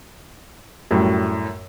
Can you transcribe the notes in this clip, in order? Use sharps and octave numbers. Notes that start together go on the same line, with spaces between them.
F#2 A2 G3